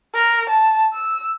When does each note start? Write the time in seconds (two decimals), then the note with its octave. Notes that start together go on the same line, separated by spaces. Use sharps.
0.14 A#4
0.49 A5
0.93 E6